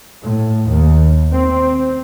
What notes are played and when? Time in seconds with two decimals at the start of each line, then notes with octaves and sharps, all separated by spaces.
0.22 A2
0.68 D#2
1.32 C4